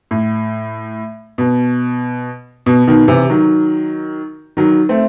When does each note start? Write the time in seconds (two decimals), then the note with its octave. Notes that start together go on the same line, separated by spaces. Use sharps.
0.11 A2
1.38 B2
2.66 B2
2.87 B2 D#3
3.08 C3 E3
3.30 D#3 F#3
4.57 D#3 F#3
4.89 A3 C4